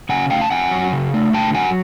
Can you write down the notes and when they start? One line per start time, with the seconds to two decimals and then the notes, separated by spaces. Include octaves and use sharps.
0.09 C#3 F#5 G#5
0.30 A3 F5 G5
0.41 A5
0.51 C4 F#5 G#5
0.71 F#3
0.92 C#3
1.14 A3
1.33 D3 G5 A5
1.54 F#3 F#5 G#5